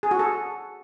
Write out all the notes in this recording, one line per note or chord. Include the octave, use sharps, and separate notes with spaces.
G#4
F#4
A4